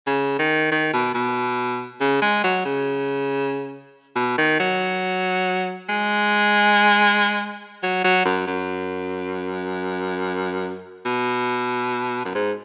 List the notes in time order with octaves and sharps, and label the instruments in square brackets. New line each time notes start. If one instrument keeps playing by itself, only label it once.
[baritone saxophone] C#3
D#3
D#3
B2
B2
C#3
G#3
F#3
C#3
B2
D#3
F#3
G#3
F#3
F#3
F#2
F#2
B2
F#2
G#2